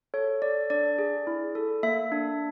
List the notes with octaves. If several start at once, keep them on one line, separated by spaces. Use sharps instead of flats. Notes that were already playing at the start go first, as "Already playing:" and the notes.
A4 C#5
A4 D5
D4 D5
G#4
E4
A4
A#3 E5
D4